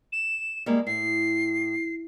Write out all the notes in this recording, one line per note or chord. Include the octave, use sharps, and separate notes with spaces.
E7
G3 G#3 A#3
A2 C7